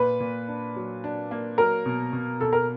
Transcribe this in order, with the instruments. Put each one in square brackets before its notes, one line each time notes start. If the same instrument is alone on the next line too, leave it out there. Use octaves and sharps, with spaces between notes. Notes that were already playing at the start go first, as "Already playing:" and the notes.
Already playing: [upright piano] A#2 [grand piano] B4
[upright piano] A#2
D4
F#3
D4
A#3
[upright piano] F#3 [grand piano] A#4
[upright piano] B2
B2
[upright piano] B2 [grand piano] A4
[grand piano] A#4